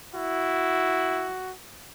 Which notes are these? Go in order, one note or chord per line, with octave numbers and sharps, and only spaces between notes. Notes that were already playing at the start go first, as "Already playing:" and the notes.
E4 F#4